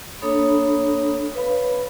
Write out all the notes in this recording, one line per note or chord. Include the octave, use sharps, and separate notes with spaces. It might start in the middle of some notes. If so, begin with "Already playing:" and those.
A#3 D4 A4 C#5 B5 D#6
B4 C#5 F5 B5